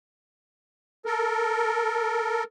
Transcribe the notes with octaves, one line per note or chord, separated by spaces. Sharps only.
A4 A#4